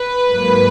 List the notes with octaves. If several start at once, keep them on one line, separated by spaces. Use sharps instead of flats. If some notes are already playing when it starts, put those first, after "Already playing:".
Already playing: B4
G#2 F#3 A#3